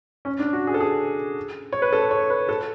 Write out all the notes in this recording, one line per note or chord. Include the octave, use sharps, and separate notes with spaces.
C#4
D4
F#4
G#4
A4
G#4
C#5
B4
A4
C#5
B4
A4